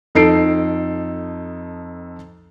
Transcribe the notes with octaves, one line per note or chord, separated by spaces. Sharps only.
F2 D#4 A4 C7 D7